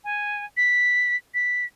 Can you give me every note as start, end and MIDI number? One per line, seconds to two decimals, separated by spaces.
0.04 0.45 80
0.57 1.16 95
1.34 1.65 95